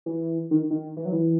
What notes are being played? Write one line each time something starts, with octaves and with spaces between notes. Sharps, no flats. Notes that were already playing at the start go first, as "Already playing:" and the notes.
E3
D#3
D#3
E3
F#3
E3